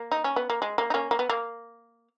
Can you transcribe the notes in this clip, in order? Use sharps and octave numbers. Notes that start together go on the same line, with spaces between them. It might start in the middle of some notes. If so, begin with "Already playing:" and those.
Already playing: A#3
D#4
C#4
B3
A#3
G#3
A#3
D#4
A#3 C#4
A#3
B3
A#3